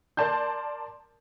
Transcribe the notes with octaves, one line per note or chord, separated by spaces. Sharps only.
A#4 D5 A5 C6 G6